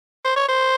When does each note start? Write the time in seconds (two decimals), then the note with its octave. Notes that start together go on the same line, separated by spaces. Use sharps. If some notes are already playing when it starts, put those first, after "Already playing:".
0.25 C5
0.36 C#5
0.49 C5